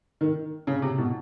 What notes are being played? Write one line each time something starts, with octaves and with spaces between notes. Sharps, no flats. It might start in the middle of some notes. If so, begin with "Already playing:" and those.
D#3
C#3
C3
B2